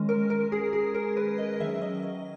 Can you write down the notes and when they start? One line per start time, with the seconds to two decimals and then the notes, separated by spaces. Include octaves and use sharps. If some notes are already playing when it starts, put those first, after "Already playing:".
Already playing: D#3 G#3 C#4
0.09 A#4
0.30 A#4
0.52 G#4
0.73 G#4
0.95 A#4
1.17 B4
1.38 D#5
1.60 D#3 F#3 C#4 E5
1.82 D#5
2.03 D#5